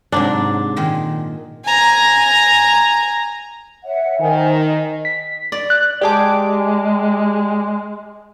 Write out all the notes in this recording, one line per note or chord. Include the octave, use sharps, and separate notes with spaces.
G#2 C3 F#3 D4
A#2 D#3 G#3
G#5 A#5
C#5 E5 F#5
D#3 C5 G#5
D#5
B6
D5
F#6
G#3 G4 G#4 D5 A5 D6